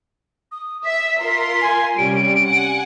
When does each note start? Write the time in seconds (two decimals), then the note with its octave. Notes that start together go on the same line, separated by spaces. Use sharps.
0.52 D#6
0.85 E5 B6
1.19 F4 A#4 C6
1.61 G#5
1.98 C3 G3 C#4 D7
2.46 F#5 G#5